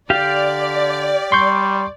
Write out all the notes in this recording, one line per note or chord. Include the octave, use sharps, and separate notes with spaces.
D3 G4 D5 F5
G3 C6 C#6 G6